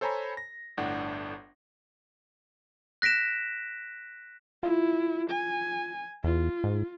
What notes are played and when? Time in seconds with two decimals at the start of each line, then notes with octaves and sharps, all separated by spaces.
0.01 A4 C5 C#5 G#5 A#5 B5
0.37 A#6
0.77 G1 A2 D4 F#5
3.02 F#6 A#6 B6 D7 E7
4.63 E4 F4
5.31 G#5
6.24 E2 F4
6.64 G#2